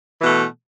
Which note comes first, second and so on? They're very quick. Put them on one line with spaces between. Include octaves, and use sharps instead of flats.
E3 B2 A3